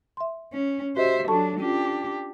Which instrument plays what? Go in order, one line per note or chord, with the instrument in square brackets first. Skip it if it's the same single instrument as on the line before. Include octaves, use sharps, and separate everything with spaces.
[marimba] E5 C6
[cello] C#4
[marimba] F#4 G4 D#5 [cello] C5 E5
[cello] F#3 D4 [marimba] A4 A5 C#6
[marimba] C#4 F4 [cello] D4 G4